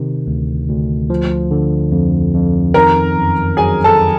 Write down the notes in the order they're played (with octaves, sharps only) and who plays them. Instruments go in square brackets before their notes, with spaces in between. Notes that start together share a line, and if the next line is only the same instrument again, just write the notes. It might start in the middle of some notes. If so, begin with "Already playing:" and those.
Already playing: [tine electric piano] C3 D#3
D2
D2
F3
D3
F2
F2
[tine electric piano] D#3 [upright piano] A#4 A#5
[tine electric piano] F#2
[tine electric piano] F#3 [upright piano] G#4 G#5
[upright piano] A4 A5